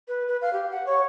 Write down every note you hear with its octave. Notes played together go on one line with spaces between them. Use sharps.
B4
B4
F5
G4
F#5
C#5